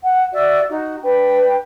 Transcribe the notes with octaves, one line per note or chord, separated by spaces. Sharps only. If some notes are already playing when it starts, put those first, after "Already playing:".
F#5
F#4 D5 E5 E6
D#4 F#4
D4 B4 G5